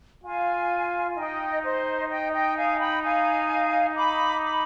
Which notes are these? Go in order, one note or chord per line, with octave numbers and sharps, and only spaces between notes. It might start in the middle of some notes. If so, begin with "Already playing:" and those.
F4 F5 G#5
D#4 D#5 G5
C5 D#5
D#5 G5
D#5 G5
F5 G#5
G5 B5
F5 G#5
B5 D6
B5 D6